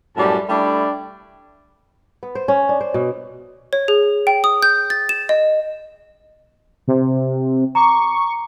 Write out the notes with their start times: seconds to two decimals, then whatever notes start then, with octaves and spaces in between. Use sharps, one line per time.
0.15 F#2 A2 G3 A5
0.49 G3 A3 D4 E4
2.23 B3
2.35 C5
2.48 C#4
2.69 D4
2.81 C5
2.94 B2
3.73 C#5
3.88 G#4
4.27 G5
4.44 D#6
4.62 G6
4.90 A6
5.09 E7
5.29 D#5
6.88 C3
7.75 A#5 C#6 D6